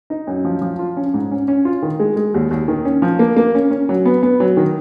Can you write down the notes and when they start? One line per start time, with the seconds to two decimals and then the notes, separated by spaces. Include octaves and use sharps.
0.10 D#4
0.27 F#2
0.45 F3
0.61 F3
0.79 F4
0.97 C#4
1.14 G#2
1.31 C#4
1.48 C#4
1.65 F4
1.82 D#3
2.00 G#3
2.16 G#3
2.34 D#2
2.51 D#2
2.68 D#3
2.85 C#4
3.02 F3
3.19 A#3
3.37 A#3
3.55 C#4
3.71 C#4
3.89 F#3
4.05 B3
4.23 B3
4.40 F#3
4.57 D#3